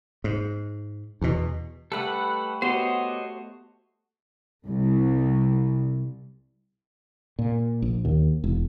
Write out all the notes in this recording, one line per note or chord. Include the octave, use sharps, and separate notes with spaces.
G#2
E2 B2
G3 A3 A4 B4 F#5
B3 F#4 G4 C5 C#5 D#5
C2
A#2
A#1
D#2
E1